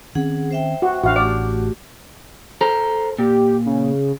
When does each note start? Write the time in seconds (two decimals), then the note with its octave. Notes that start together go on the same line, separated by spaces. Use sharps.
0.15 D#3 C4 C#4 G#4 F#5
0.51 C5 E5 G5
0.82 F#4
1.03 A1 D4 F#4 F5
1.16 A3 F#4 G4 D5
2.61 A4 C5 A#5
3.19 A#2 G4
3.66 C#3